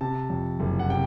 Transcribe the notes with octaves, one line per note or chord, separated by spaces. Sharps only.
C3 A5
F2
F#1
F#5
C3 G5